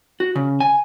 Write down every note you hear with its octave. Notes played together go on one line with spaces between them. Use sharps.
F#4
C#3
G#5